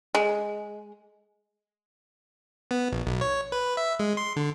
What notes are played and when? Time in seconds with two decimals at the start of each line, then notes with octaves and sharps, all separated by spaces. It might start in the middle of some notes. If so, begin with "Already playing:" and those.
0.15 G#3
2.71 B3
2.92 A#1
3.06 B1
3.21 C#5
3.52 B4
3.77 E5
3.99 G#3
4.17 C6
4.36 D3